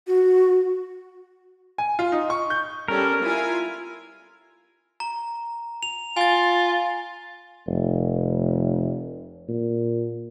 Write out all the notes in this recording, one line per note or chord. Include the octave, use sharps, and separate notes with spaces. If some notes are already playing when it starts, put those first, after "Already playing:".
F#4
G#5
F4
D#4
C#6
G6
G3 C#4 A4 A#4
E4 F4 G#5
A#5
F7
F4 G#5 A6
F1
A#2